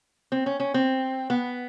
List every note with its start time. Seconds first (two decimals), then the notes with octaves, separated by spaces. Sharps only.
0.32 C4
0.46 C#4
0.60 C#4
0.74 C4
1.30 B3